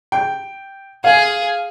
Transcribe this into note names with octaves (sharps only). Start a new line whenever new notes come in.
G5
G#4 F5